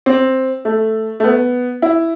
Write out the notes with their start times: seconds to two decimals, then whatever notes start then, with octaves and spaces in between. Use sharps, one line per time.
0.06 C4
0.65 A3
1.20 A3
1.24 B3
1.82 E4